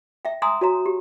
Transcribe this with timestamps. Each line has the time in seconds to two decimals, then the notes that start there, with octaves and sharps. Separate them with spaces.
0.25 E5 G5
0.42 G#5 A#5 C6 D#6 E6
0.61 F#4 C#5 A#5
0.86 G4